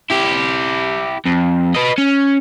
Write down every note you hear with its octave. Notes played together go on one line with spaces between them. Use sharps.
E4 G4
F2
B4 D#5
C#4